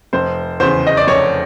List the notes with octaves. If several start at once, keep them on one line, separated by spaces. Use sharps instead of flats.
F1 C5
E2 C#3 C5
D#5
D5
F1 C#5